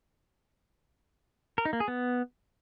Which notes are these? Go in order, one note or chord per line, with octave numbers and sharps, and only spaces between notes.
A#4
D#4
A#3
G#4
B3